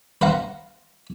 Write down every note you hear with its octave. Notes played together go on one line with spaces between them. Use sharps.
B4 C5 F5 F#5 A#5